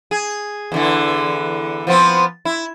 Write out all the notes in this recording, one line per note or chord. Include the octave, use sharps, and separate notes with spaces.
G#4
E2 D3 E3
F3 B3 C4
E4